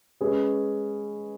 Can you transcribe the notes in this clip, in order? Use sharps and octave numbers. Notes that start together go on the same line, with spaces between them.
G#3 C#4 G#4 B4